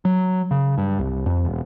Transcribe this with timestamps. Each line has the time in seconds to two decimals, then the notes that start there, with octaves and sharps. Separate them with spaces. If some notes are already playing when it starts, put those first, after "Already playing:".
0.05 F#3
0.51 C#3
0.78 G2
0.99 C2
1.26 F2
1.45 E1